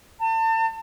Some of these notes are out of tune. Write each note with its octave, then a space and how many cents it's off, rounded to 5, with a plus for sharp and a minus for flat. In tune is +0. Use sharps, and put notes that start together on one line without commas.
A5 +35